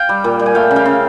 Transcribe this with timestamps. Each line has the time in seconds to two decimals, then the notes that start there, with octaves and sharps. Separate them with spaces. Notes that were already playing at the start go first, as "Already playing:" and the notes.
Already playing: F5 G5
0.09 G3
0.24 A#2
0.39 G3
0.46 G#5
0.55 A3 F5 G5
0.71 C#3
0.76 F5 G5
0.86 C#3